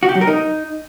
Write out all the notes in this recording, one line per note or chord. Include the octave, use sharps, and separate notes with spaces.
F#4
G4
F#3
A#4
D#4